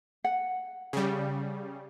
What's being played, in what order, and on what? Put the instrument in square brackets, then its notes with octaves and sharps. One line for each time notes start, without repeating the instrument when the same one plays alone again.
[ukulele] F#5
[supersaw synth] C#3 G3